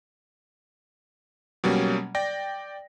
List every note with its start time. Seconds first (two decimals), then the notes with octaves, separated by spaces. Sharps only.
1.64 B2 F#3 G3 A#3 C#4
2.15 D5 G5 A#6